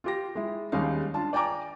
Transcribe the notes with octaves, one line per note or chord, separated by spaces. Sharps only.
F4 G4 A#6
G#3 E4
D#2 G3 G#3 C#4 D#4 F5
D4 F4 A5
D5 G5 G#5 A#5 D6